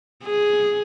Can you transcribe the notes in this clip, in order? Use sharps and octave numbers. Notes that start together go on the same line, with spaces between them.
G#4